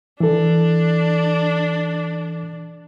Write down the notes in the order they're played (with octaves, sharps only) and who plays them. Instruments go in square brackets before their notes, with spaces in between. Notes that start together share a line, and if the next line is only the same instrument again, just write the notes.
[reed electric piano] E3 A4 [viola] D4